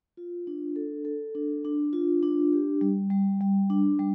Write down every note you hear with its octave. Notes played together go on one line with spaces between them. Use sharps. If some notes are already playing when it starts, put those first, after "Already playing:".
F4
D4
A4
A4
D4
D4
F4
D4
G4
G3
G3
G3
D4
G3